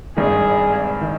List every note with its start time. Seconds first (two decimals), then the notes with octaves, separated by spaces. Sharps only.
0.16 G#1 G2 D#3 G#4
1.01 D#3